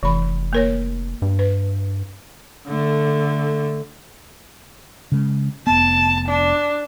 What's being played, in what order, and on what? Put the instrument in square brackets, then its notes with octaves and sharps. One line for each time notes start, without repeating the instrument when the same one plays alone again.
[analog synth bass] F1 [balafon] E3 B5
[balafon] A#3 A#4 C#5
[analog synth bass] G2
[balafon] B4
[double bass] D3 A3
[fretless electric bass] C#3 G#3
[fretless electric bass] F1 B3 [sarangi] A5
[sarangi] D4